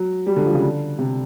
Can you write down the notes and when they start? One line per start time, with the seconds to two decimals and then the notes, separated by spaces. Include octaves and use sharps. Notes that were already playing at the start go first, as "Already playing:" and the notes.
Already playing: F#3
0.27 G3
0.36 D3
0.45 F3
0.54 C#3
0.63 D3
0.99 C3